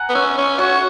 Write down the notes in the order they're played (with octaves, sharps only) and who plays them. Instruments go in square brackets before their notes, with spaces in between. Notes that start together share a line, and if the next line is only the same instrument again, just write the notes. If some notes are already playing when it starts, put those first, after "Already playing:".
Already playing: [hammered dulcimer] F#5 G#5 A#5
[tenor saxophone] B3
[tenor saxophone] C#4 [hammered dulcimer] E5
[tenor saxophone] C#4
[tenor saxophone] F#4 [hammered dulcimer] C#5